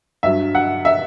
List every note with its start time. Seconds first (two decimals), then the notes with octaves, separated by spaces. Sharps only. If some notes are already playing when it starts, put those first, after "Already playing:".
0.23 G2 F#3 E5
0.55 F#5
0.85 E5